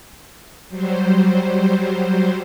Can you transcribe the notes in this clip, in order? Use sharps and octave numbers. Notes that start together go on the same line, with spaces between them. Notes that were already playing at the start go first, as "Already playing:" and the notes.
F#3 G3 C5